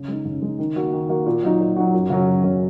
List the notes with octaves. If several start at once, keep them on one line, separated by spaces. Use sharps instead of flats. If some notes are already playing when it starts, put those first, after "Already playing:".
Already playing: C#3
G#3 D#4
C#3
G#3 D#4
D#3
A#3 F#4
D#3
A#3 F#4
A#2
F#3 D#4 F#4
A#2
F#3 D#4 F#4
F#2
C#3 F#3 C#4
F#2
C#3 F#3 C#4